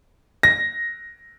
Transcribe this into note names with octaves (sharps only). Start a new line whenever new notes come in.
A#6